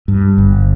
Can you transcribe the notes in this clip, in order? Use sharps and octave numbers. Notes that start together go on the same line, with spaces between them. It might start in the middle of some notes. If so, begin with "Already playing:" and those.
G2
G1